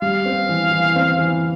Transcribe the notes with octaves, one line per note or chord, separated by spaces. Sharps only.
G3 F5
C4
E3
E3
C4
E3